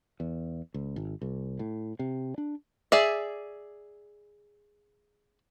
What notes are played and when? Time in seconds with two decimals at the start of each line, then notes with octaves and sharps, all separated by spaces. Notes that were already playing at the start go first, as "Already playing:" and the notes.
0.20 E2
0.74 C#2
0.96 G#1
1.22 C2
1.59 A2
1.99 C3
2.38 D4
2.92 G#4 D5 E5